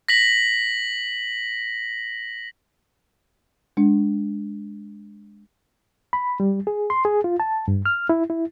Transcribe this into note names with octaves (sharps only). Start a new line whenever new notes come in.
A#6 B6 F#7
G#3 D4
B5
G3
G#4
C6
G#4
F4
A5
G2
F6
E4
E4